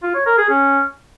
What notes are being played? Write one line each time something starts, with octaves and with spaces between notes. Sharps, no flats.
F4
C#5
A#4
G#4
C#4